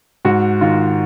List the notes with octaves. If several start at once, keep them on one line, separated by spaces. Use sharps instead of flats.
G#2 F#4
D#3 F4